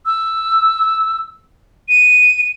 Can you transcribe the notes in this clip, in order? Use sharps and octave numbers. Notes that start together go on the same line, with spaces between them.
E6
D#7